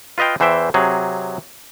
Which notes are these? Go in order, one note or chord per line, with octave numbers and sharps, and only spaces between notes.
F4 B4 D#5 F5 G5
E2 E3 C5 E5 G5
C3 F#3 G#4